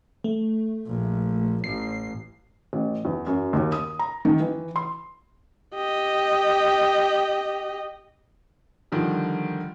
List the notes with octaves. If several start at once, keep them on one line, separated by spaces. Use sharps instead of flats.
A3
A#1
A1 C7
A1
E2
F#2
D#2
D#6
A#5
D#3
E3
C6
G4 D#5
D3 D#3 F3 G3